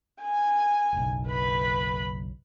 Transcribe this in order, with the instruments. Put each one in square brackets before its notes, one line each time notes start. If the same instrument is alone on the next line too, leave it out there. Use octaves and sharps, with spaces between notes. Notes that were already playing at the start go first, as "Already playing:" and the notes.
[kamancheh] G#5
[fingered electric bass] F#1 B1
[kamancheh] B4 B5